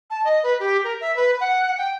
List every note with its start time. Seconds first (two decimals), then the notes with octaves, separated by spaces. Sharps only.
0.10 A5
0.24 D#5
0.43 B4
0.60 G4
0.84 A#4
1.01 E5
1.16 B4
1.40 F#5
1.78 G5